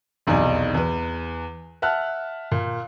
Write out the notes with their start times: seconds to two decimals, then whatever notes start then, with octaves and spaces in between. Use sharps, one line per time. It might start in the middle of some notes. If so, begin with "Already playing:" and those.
0.27 F1 B1 E2 D#4 D5 G#5
0.74 E2 B4
1.82 E5 F#5 A5 F6 F#6
2.52 A#2